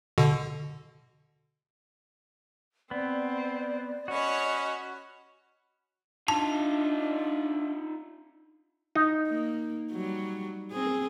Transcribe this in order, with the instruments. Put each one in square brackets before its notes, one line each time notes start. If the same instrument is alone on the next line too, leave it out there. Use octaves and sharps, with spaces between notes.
[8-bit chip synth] B2 D3
[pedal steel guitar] B3 [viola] C4 [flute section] D5
[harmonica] C#4 B5 [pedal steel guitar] F#4 [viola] C#5 D#5
[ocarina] D4 [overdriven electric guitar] D#4 F4 [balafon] A5
[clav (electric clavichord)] D#4
[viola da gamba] A#3
F#3 G3
C4 G#4